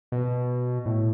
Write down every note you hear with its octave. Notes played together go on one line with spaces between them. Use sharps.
B2
A2